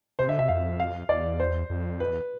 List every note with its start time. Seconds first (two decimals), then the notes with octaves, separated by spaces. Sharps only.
0.19 C3 C5
0.28 D3 E5
0.39 C3 E5
0.48 F2 F5
0.80 F5
1.09 E2 D5
1.40 C5
1.70 F2
2.00 B4
2.10 E2